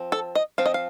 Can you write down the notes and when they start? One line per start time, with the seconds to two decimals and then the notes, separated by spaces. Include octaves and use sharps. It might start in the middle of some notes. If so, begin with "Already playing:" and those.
Already playing: F3 C4
0.12 A4
0.35 D#5
0.58 F3 C4 F5
0.66 D#5
0.74 F5